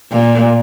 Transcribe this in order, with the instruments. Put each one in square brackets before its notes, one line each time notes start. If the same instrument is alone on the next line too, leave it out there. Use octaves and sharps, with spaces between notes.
[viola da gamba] A#2